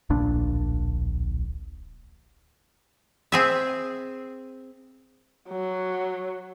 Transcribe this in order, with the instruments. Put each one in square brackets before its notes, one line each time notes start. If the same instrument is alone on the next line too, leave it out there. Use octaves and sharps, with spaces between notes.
[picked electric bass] D1 A#1 A#2 D4
[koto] C4 G#4 E5
[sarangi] F#3